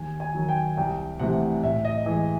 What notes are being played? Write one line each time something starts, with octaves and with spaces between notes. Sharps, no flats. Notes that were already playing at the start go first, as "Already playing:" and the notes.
Already playing: D#2 G#5
G#5
D#3 F#3
G5
C2 G5
C3 E3 A3 F#5
A2 E5
D#5
E3 G#3 D#5